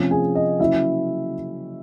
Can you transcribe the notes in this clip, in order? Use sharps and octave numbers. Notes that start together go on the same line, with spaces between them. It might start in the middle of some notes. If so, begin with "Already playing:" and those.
Already playing: C3 F3 A3 C#4
G#4 G#5
D#5
C#3 F#3 A#3 C#4 E4 E5